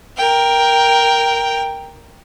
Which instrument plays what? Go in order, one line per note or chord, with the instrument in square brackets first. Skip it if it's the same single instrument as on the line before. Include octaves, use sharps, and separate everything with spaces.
[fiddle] A#4 G5